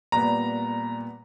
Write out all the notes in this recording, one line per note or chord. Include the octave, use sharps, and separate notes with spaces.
A#2 G3 B3 A#5